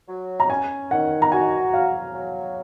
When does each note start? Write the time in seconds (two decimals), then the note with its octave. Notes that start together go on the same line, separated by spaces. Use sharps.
0.08 F#3
0.40 A#5
0.49 C#4 G#5
0.91 D#3 F#5
1.22 A#5
1.32 F#4 G#5
1.73 F#3 F5
2.15 F#3